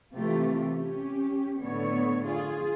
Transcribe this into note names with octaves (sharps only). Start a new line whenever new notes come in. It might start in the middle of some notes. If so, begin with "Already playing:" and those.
C3 E3 A3 F4 G4
C#4 G4
A2 D3 B3 C#5
F4 G#4